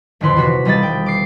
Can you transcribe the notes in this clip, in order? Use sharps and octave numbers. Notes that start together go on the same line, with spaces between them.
D#1 F2 D3 E3 B4 C6
C3 F#4 B6
E1 G3 D#5 B5 A6
G5
D6 C7